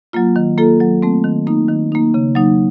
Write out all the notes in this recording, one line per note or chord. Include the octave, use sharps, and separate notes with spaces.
F#3 A#3 F4
D#3
A#3 F4 A4
F#3
A3 C4
D#3
A#3 D#4
D#3
A#3 D#4
C#3
F#3 A#3 D#4